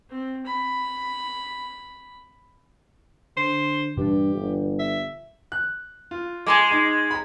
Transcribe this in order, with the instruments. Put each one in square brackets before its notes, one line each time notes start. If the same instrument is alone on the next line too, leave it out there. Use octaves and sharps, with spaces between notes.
[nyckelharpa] C4
B5
[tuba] D3 [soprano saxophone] C5
[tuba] G2 [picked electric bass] A#2 E3 D4 [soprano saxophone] G4
[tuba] G1
[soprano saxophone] E5
[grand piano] F#6
F4
[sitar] G#3 [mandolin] G#4 C6 D6
[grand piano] D#4
A#5 B5